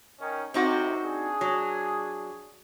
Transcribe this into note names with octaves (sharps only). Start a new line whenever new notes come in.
D#3 C#4 D#4
A2 C3 C4 D#4 F#4
D4 G#4
F#3